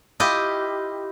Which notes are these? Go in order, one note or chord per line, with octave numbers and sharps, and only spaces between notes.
E4 F4 G4 D#5